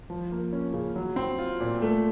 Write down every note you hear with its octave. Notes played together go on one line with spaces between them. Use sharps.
F3
A#3
C#4
C#3
F#3
C4
F4
A#2
A3